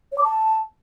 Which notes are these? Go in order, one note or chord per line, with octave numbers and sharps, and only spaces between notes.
C#5
D6
A5